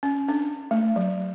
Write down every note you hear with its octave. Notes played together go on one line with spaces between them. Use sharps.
C#4
D4
A3
F#3